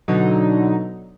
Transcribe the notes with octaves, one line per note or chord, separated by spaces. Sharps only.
B2 D3 F#3 D#4